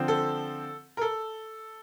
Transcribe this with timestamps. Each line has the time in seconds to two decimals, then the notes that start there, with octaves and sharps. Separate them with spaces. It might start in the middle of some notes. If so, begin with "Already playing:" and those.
Already playing: D3 F3 C4
0.08 A4
0.97 A#4
1.01 A4